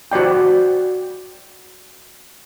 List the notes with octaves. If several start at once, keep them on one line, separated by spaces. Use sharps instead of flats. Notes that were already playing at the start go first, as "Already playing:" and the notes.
F#4 C5 D5 G5